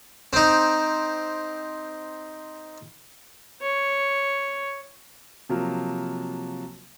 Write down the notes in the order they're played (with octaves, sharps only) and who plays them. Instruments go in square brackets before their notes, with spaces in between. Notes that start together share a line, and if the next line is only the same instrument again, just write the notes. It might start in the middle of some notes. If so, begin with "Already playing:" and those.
[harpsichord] C4 D#4
[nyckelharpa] C#5
[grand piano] C3 F3 F#3 A#3 A#4